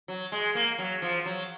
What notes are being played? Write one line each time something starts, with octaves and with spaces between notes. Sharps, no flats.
F#3
G#3
A#3
F#3
F3
F#3